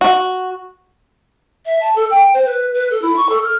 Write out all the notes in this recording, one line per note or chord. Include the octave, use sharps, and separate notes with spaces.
F#4
E5
A5
A4
G5
C5
B4
B4
A4
E4
C#6
A4
F6